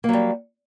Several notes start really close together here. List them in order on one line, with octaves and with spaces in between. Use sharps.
A#3 F#3 G3